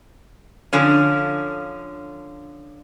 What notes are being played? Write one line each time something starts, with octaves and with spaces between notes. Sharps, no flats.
D3 F3 C#4